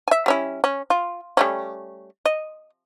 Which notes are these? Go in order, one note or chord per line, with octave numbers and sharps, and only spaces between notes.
E5 G#5
G3 C#4 E4
C#4
F4
G3 A3 C#4
D#5